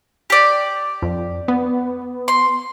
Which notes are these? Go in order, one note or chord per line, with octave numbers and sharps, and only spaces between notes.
G4 D5
F2
B3
C6